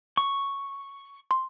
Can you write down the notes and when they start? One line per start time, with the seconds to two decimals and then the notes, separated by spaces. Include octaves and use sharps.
0.17 C#6
1.31 C6